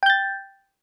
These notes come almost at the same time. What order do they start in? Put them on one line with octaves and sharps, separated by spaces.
G5 G6 A6